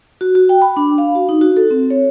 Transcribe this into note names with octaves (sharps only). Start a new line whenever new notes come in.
F#4
F#4
G5
B5
D4
F5
F#4
D#4
F#4
A4
C4
C#5